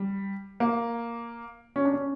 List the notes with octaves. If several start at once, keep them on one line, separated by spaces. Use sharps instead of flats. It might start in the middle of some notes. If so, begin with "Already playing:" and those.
Already playing: G3
A#3
C#4
D4
C#4